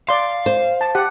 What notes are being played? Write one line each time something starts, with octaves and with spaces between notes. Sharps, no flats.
D5 F5 C6
C5
A5
G4 F#5